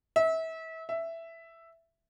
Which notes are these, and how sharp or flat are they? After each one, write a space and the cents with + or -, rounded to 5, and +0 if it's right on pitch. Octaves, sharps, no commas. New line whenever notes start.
E5 -30
E5 +5